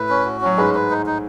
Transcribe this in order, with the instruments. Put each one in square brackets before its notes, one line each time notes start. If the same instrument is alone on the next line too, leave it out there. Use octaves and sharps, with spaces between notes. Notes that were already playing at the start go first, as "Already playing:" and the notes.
Already playing: [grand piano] A2 A3 [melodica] B4
[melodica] C#4
F#4
[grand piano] F#3 [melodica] C#4
[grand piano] G#2 G#3 [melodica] B4
[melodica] B4
D#4
D#4